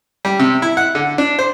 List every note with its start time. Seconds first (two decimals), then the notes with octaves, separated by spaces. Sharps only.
0.25 G3
0.40 C3
0.62 E4
0.77 F#5
0.95 D3
1.18 D4
1.39 C5